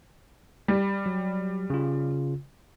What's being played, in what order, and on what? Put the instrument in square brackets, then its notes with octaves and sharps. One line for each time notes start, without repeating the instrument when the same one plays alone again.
[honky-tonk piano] G3
[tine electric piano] F#3
C#3 F4